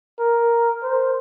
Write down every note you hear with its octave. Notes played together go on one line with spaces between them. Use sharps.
A#4
C5